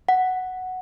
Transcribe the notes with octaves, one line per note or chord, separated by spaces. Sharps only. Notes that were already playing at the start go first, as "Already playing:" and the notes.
F#5